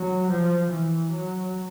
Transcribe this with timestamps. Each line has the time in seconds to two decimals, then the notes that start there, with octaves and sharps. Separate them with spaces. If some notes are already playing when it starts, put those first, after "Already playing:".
Already playing: F#3
0.30 F3
0.70 E3
1.10 F#3